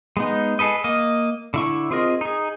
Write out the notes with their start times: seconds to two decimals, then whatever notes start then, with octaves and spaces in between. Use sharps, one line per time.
0.17 G#3 B3 D#4
0.59 G#4 A4 B4 D#5
0.84 A#3 D#5
1.54 D3 E4 C#6
1.91 C4 F4 G#4 A#4 D#5
2.21 D#4 G#4